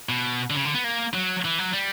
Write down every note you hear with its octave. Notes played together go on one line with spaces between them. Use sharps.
B2
D3
C#3
D3
B3
A#3
F#3
E3
F#3
G3